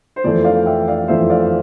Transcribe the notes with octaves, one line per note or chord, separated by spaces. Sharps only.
C5
F2 E3 A3 D5
D5 F5
E5 G5
D5 F5
F2 E3 A3 C5 E5
D5 F5